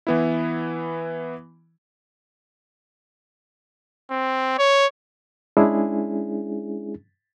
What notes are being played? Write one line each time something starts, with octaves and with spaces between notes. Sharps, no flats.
E3 B3 E4
C4
C#5
G#3 C#4 D4 E4 G#4